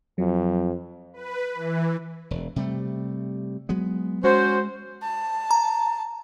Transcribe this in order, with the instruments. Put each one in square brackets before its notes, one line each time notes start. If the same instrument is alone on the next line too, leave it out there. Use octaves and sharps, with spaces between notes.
[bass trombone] F2 [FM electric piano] F#3
[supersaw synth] B4
E3
[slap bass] E1
C3 G3 A3
F#3 G#3 B3
[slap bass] G#3 [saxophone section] C#4 F#4 C5
[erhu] A5
[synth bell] A#5